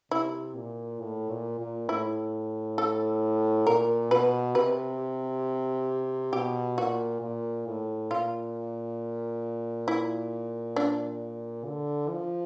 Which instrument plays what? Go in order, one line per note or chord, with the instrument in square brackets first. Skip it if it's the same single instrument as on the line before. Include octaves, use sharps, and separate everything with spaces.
[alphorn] C3 [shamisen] E4
[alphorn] A#2
A2
A#2
A#2
[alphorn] A2 [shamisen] E4
[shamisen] A4
[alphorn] A#2 [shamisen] A#4
[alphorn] B2 [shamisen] B4
[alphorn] C3 [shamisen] B4
[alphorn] B2 [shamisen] G4
[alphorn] A#2 [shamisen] F#4
[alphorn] A#2
A2
[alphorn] A#2 [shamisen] F4
[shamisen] E4
D4
[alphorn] D3
F3